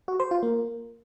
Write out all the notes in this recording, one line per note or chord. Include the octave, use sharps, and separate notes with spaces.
F#4
C5
F4
A#3